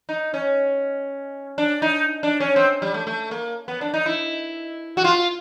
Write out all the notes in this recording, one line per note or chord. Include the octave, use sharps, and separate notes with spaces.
D#4
C#4
D4
D#4
D4
C#4
C4
G3
A3
A3
A#3
B3
D4
D#4
E4
F#4
F4